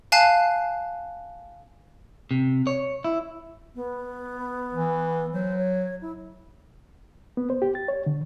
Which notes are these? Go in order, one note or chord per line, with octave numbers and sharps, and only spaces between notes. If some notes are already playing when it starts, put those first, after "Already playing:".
F5 G#5 A5 F#6 C7
C3
C#5
E4
B3
E3
F#3 C5
C#5
E4
B3
C5
G4
A6
C#5
D3